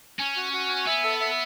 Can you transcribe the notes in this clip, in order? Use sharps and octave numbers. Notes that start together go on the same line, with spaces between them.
C#4 G#5
F#4
F#4
G#5
B3 E5
A4
E5